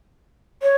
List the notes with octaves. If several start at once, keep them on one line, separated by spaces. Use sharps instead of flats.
C#5